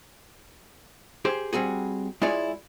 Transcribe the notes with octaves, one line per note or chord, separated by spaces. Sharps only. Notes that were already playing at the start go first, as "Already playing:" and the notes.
G4 G#4 C5
G3 C4 F#4 G#4
G#3 E4 F4 G#4 C#5 D5